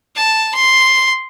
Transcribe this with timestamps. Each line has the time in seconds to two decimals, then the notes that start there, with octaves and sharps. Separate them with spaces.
0.16 A5
0.54 C6